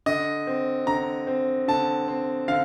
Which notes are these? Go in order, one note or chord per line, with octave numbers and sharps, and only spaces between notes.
D3 D#5
C4
D3 A#5
C4
D3 A5
C4
D3 F5